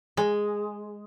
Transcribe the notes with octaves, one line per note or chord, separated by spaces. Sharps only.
G#3